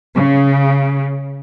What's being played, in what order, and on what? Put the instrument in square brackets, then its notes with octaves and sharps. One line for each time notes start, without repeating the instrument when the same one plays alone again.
[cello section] C#3